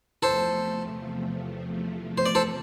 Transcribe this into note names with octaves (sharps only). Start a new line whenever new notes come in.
E2 C3 F3 A3 A4 C5
C5
D5
A4 C5